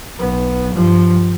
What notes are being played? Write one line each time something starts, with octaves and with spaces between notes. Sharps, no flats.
B1 B3
G2 F3